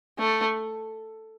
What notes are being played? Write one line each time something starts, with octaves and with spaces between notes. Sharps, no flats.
A3